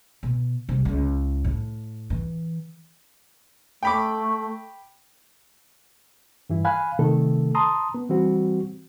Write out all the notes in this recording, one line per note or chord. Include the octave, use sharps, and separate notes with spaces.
B2
C2
C#2
A2
E3
A3 G5 B5 D6
G2 E3 E4
F5 G#5 B5 F#6
C3 D#3 A3 A4
A5 A#5 C6 D#6
B3
E3 G3 C4 F#4